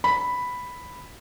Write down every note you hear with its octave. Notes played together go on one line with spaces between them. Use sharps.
B5